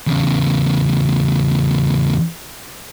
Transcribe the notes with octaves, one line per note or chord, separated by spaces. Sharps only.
E2 C#3